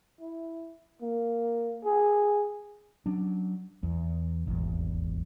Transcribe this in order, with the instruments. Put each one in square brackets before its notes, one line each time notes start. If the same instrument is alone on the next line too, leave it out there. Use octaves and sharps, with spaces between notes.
[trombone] E4
A#3
G#4
[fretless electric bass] F#3 C#4 D4
E2
D#1 G#1 E2